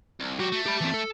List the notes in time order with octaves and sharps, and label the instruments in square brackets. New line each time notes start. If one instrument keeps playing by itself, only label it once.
[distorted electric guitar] C2
[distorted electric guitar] F#3 G4 [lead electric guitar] F#4
[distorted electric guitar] A3
[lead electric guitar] G4 B5
E3 C4
A4